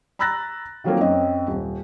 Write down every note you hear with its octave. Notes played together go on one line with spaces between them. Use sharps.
A#5 B5 E6 F#6 A6 A#6
D#3 F3 F#3 A3 A#3 C4
F#2 C4 D#5
D#1